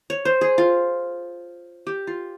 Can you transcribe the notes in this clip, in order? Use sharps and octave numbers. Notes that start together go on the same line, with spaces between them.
C#5
C5
G#4
F4
G4
F4